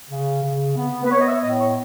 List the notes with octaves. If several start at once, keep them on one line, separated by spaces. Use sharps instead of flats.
C#3
C#3
B3
B4
B3 C#5
D#5
E5
A2 D#5
C#5